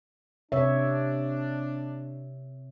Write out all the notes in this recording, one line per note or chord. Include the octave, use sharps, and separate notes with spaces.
C3 D4 C#5 E5